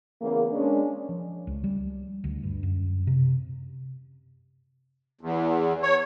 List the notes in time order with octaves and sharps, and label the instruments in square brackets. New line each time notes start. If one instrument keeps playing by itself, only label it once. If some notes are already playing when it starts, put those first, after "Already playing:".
[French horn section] E2 C#3 A#3
G#3 C#4 D4
[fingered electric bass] F3
C#2
G3
D2
G2
F#2
C3
[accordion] E2
C#5